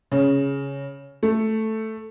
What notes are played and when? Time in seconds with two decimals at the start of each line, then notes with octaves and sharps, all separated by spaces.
0.12 C#3
1.23 A3